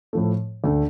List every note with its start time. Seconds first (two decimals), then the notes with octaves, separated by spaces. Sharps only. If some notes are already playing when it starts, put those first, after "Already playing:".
0.13 A2 F3 A3
0.64 D2 D3 A3